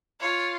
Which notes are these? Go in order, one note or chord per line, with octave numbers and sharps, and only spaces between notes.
F4 C#5